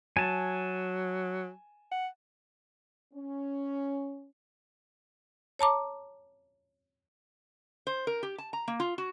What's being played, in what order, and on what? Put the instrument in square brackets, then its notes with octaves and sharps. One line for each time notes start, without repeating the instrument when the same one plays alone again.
[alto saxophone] F#3 [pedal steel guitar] G#5 A5
[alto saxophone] F#5
[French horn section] C#4
[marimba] C#5 A5 A#5 D6
[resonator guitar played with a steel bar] C5
A#4
G4
A5
A#5
A#3
F4
F#4